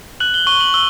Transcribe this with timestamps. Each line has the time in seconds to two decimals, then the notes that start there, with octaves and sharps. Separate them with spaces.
0.20 F#6 F#7
0.34 G7
0.47 C#6 G7
0.60 F#7
0.74 E6 G7